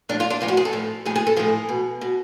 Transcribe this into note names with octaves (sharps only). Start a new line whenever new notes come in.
A2 F3 D4
F4
D4
A2 F3 F4
F#4
G#4
A4
A2 F3
A2 F3 G#4
G#4
A4
A2 F3 G#4
B2
B2